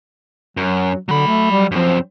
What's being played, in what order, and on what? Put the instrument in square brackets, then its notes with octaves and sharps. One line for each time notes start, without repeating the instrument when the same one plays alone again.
[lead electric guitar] F#2 [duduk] F#3
[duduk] D3 [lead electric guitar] F#3 B5
[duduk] A3
G3
[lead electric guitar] F#2 C4 [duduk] F3